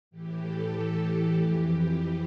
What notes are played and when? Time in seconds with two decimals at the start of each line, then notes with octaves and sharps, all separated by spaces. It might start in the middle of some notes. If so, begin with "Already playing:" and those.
0.11 A2 E3 G4
0.41 A4
0.72 G4
1.33 F2 E3